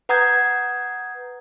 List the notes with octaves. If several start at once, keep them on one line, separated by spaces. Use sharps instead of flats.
B4 F#5 A#5 D#6 G6 G#6